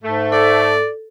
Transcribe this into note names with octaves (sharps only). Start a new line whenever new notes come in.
G#2 A3
A4 D5